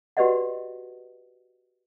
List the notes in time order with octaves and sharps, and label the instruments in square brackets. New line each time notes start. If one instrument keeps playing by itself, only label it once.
[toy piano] F#4 G4 B4 D5 D#5 F#5